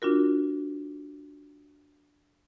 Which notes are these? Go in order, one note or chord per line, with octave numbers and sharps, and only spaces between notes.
D4 F4 F#4 A#4